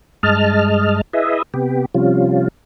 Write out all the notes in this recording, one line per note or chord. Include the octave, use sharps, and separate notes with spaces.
G2 G#3 D#5 A5 F6
E4 G#4 B4 D#5 E5
C3 B3 G4
C3 F3 G3 C#4 F4